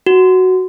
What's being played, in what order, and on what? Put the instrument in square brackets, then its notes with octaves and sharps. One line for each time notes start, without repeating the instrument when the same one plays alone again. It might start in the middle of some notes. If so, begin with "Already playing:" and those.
[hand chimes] F#4